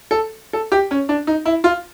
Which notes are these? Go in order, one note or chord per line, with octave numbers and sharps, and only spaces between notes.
A4
A4
G4
C#4
D4
D#4
E4
F4